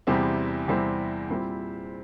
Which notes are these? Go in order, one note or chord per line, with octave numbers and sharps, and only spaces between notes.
E2 C3 G3 C4 E4
E2 C3 G3 C4 E4
A#2 G3 C4 E4